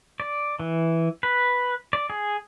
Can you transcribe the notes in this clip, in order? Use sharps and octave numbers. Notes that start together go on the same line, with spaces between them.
D5
E3
B4
D5
G#4